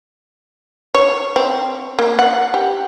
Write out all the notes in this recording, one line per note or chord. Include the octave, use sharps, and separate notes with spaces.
C#5
C4
A#3
F#5
G4